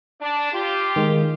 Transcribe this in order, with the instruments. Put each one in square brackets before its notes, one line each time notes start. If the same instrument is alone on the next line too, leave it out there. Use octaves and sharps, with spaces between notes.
[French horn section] D4
F4 G4
[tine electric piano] D#3 G#3